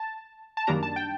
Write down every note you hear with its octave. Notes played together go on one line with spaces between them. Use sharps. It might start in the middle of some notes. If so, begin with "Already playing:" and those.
Already playing: A5
A5
F#2 D#3 G3 A#3 D4 A#5
A5
G5